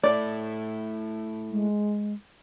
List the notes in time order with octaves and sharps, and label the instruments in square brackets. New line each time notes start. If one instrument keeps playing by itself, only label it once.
[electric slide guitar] A3 E4 A4 [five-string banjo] D5
[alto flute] G#3